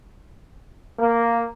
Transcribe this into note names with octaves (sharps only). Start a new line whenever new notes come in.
A#3